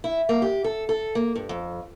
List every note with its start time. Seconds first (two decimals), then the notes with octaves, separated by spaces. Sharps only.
0.04 E4
0.29 A#3
0.42 G4
0.64 A4
0.89 A4
1.15 A#3
1.36 G2
1.49 F2